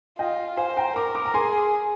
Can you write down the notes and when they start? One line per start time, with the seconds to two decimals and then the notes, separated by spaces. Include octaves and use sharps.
0.19 F4 D#5 G5
0.57 C5 F5 G#5
0.77 G5 A#5
0.96 A#4 A#5 D6
1.15 A#5 D6
1.26 A#5
1.34 G#4 G#5 C6